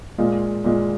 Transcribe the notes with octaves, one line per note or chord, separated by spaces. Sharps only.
A#2 G#3 F4
A#2 G#3 F4